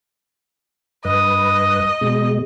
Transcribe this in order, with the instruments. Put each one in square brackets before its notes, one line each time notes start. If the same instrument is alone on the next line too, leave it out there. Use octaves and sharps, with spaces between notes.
[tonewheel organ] G2 B4 [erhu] D#5
[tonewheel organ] B2 G#3